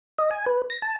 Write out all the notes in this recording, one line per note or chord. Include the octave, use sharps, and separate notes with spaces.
D#5
G#5
B4
A#6
A5